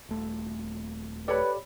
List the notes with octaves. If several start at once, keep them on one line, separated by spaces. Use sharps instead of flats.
D#1 A3
G4 A4 B4 C#5 D5 B5